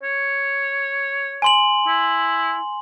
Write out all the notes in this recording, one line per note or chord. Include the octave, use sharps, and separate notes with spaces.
C#5
G#5 C6 F#7
E4